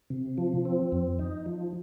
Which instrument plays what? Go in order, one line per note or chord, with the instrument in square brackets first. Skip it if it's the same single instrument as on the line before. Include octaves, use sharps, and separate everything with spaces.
[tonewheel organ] C3
F3
C4
F2
D#4
F3